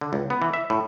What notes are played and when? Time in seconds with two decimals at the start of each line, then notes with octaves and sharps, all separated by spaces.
0.01 D3
0.13 C#2
0.30 B3
0.42 E3
0.54 E5
0.70 A2